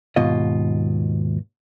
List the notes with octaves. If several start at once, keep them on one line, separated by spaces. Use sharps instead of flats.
D#2 G#2 B2 F4 D#5